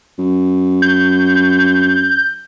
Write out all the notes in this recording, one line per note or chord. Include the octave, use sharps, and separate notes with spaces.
F#2
G6